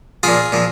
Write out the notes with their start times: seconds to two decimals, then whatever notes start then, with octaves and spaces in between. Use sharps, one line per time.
0.23 A#2 F3 F4 G#4
0.52 A#2 F3